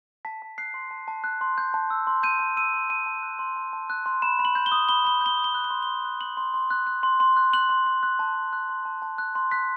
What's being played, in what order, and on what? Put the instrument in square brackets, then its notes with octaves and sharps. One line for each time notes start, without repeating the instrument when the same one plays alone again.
[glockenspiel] A5 B6
A5
F#6 C7
C6
A5
A5
F#6
C6
G6
A5
E6
C6
G6 D#7
A5
E6 D#7
C6
A5 D#7
A5
F#6
C6
A5
A5
F#6
C6
B5 E7
B5
F#7
G6
G7
D#6
B5 G7
B5 G7
G6 G7
D#6
G7
F#6
G7
C6
C6 G7
F#6
F#6 F#7
C6
C6
F#6
F#6
C6
C6
F#6
F#6 F#7
C6
C6
F#6
A5
A5
F#6
C6
A5
A5
F#6
C6
F#6 B6